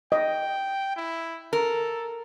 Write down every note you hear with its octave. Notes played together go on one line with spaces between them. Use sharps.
D#5 G5
E4
A4 A#4